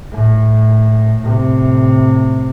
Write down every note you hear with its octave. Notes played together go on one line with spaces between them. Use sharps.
A2
A2 C3